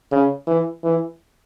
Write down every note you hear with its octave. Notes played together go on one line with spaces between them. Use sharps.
C#3
E3
E3